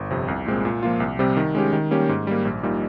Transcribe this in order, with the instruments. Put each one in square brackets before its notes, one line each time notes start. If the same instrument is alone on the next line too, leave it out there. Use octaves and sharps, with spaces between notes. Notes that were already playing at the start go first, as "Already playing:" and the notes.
Already playing: [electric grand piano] G1
F2 C3
C2
A#2 G#3 C4
A#2
F3 A#3 F4
C2
C3 G3 C4 G4
D#3
G#3 C#4 G4
D#3
G3 A#3 C#4 G4
G#2
G3 A#3
A#1
A#2 G3 A#3 D#4